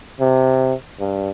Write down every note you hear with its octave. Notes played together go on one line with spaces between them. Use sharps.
C3
G2